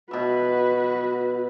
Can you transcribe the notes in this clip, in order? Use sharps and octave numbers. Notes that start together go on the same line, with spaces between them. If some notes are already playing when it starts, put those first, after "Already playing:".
B2 F#4 B4 E5